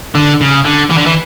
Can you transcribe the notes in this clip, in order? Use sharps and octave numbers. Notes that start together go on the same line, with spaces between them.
D3
C#3
D3
E3
D3
E3